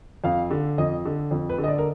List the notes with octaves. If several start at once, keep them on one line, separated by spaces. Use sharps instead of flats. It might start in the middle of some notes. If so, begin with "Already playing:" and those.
F2 F5
D3
F2 D#5
D3
F2
B4
D3
D#5
D5
A#4